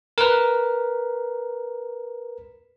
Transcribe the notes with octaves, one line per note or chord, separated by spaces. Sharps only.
A#4 B4